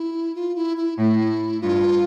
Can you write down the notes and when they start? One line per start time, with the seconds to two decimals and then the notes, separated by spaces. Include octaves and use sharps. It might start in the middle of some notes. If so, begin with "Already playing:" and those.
Already playing: E4
0.35 F4
0.56 E4
0.77 E4
0.98 A2 E4
1.61 G2 F4